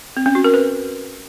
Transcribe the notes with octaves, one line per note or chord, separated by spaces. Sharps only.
C4
C#4
F#4
A#4
B4